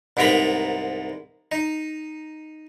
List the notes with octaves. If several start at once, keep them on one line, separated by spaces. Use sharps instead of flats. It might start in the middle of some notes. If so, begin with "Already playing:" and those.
C2 G#2 B3 A#4 A#5 B5
D#4